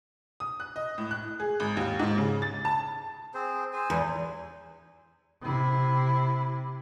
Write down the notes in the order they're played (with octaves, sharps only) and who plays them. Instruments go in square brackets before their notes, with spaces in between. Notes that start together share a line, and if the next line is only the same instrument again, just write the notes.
[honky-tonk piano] D#6
F#6
D#5
A2
F#6
G#4
G#1
D#2
G#2
C#3
A6
A5
[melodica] C4 G#4 C5
G#4 C5 G#5
[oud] E2
[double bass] C3 E4